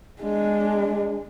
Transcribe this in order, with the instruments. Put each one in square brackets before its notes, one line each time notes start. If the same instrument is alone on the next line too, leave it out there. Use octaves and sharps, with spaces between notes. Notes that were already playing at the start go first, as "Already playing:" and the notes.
[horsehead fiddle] G#3 D4